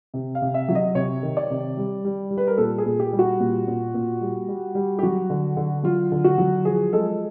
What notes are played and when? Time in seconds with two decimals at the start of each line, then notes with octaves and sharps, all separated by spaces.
0.14 C3
0.35 F5
0.42 C3
0.54 E5
0.69 F#3
0.75 D#5
0.95 C3 C#5
1.23 D#3
1.37 D5
1.50 C3
1.77 G3
2.05 G3
2.31 G3
2.38 B4
2.47 A#4
2.58 A#2 A4
2.78 G#4
2.86 A#2
3.00 G4
3.13 G3
3.19 F#4
3.40 A#2
3.68 A#2
3.94 A#2
4.21 G3
4.48 G3
4.75 G3
4.99 G4
5.03 F#3 F#4
5.30 D3
5.57 D3
5.83 F#3 F4
6.12 D3
6.24 F#4
6.38 F#3
6.65 F3 G#4
6.93 G#3 A4